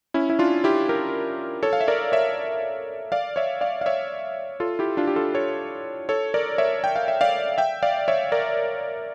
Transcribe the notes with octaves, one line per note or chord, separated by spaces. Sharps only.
C#4 E4
E4
D4 F4
E4 G4
G4 A#4
A4 C#5
F5
E5
A#4 D5
C#5 E5
D5 F5
C#5 E5
D5 F5
F5
C#5 E5
F4 A4
E4 G4
D4 F4
G4
F4 A4
A4 C#5
A4 C#5
A#4 D5
C#5 E5
G5
F5
E5
D5 F5
E5 G5
D5 F5
C#5 E5
A#4 D5